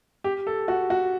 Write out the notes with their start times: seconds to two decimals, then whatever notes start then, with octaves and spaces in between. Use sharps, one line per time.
0.24 G4
0.47 A4
0.68 F#4
0.90 F#4